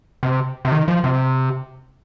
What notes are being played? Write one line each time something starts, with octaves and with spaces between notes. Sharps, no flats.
C3
C3
D#3
F3
C3